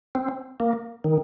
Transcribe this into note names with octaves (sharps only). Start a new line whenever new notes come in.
C4
A#3
D#3